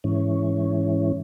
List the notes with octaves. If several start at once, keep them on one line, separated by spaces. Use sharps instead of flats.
G#2 E3 C#4